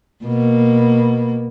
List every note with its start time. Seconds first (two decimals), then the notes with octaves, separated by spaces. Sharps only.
0.24 B2 A#3